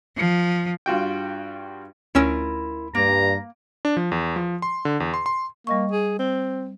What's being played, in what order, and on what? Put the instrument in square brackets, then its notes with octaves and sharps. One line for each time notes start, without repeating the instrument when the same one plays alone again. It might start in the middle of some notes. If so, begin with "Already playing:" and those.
[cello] F3
[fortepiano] G2 F4 F#4 G5
[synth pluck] D2 C#4 E6 [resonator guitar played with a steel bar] E4 F4 A#4
[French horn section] G2 [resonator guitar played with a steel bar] A#3 [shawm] A#5
[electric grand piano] D4
F3
E2
F3
C6
D3
E2
C6
C6
[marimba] G3 D#5 C#6 [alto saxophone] A#3
[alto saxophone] G#4
C4